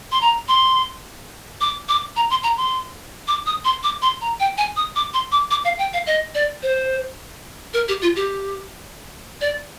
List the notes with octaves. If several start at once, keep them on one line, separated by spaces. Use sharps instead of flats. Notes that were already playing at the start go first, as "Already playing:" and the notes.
C6
A#5
C6
D6
D6
A#5
C6
A#5
C6
D6
D#6
C6
D6
C6
A#5
G5
G#5
D#6
D6
C6
D6
D6
F5
G5
F5
D#5
D5
C5
A#4
G4
F4
G4
D5